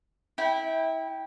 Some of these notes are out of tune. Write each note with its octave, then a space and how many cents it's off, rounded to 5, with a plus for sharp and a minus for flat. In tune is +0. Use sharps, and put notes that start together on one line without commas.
E4 -25 G5 +0